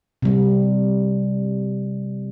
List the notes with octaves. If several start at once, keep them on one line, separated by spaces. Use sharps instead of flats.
C3 G3